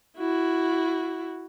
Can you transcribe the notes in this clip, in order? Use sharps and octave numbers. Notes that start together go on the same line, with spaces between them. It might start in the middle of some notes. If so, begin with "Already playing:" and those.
E4 F#4